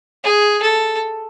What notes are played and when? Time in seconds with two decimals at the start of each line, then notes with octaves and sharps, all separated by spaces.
0.24 G#4
0.63 A4